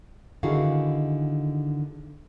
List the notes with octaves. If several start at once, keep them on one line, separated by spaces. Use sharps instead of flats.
D3 D#3 E4 F#4 G#4 F5